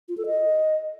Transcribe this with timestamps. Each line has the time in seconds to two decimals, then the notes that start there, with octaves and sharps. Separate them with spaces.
0.09 F4
0.17 A4
0.26 D#5